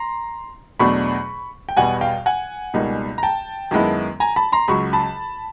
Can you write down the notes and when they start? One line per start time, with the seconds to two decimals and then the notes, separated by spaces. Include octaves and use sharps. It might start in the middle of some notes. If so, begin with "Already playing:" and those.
Already playing: A#5 C6
0.79 E2 B2 F#3 A3 D4 B5 C#6
1.69 G5
1.77 E2 B2 G3 B3 F#5 G#5
2.01 F5 G5
2.26 F#5 G#5
2.74 C#2 B2 G3 A#3 D#4
3.18 A#5
3.23 G5 A5
3.71 F#2 D#3 G#3 B3 E4
4.20 G#5 A#5
4.36 A5 B5
4.52 A#5 C6
4.68 C#2 C#3 F#3 B5 C#6
4.93 A5 B5